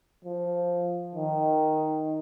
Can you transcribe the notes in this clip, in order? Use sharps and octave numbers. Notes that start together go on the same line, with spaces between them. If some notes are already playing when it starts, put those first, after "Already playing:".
F3
D#3